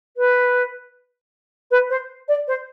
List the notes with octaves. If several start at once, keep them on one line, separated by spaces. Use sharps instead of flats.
B4
B4
C5
D5
C5